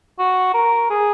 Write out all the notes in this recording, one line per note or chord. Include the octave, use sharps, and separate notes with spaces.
F#4
A#4
G#4